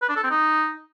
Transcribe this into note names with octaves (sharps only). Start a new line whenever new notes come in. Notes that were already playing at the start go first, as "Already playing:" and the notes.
B4
D4
A4
C4
D#4